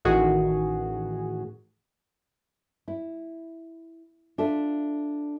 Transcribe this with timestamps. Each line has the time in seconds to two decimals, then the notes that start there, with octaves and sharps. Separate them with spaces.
0.05 A1 A2 D#3 F#4 G#4
2.88 E4
4.38 D4 F4 A4 E5